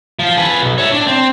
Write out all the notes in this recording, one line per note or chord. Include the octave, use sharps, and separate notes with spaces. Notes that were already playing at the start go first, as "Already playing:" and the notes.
F3 F4
G#4 B4
B1
C#5 E5
D4
C4